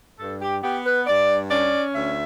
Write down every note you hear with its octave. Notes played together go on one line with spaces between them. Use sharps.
G2 A4
G4
B3 G4
B4
G2 D5
C#4 D5
D2 E5